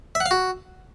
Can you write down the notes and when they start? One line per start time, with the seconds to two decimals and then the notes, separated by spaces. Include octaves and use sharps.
0.15 E5
0.20 F#5
0.26 F5
0.31 F#4